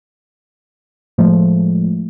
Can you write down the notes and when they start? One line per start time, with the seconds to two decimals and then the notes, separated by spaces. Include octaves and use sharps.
1.18 A2 F3 G#3 A3